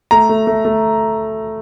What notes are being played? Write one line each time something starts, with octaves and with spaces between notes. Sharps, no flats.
A3 A#5
A3
A3
A3